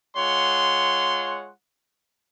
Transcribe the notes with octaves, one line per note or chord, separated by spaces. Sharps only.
G#3 F4 C#5 F#5 C6